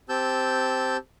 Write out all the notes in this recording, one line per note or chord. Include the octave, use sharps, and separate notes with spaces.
C4 G4 A5 E6 G6